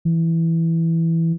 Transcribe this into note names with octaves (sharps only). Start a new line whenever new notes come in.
E3